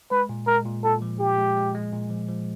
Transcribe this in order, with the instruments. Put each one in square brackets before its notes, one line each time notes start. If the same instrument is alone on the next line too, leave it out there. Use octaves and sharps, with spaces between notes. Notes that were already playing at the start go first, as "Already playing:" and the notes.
[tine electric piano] G#3 [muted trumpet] B4
[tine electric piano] A#2
[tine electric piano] G#3 [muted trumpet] A#4
[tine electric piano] A#2
[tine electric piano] A#2 [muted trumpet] A4
[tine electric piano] F3
[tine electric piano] A#2 [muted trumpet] G4
[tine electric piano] G#3
G#3
G#3
A#2
F3
F3